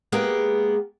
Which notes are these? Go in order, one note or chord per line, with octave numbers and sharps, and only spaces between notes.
G#3 A#3 B3 G4 G#4 B4